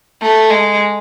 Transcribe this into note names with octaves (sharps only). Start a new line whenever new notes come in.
A3
G#3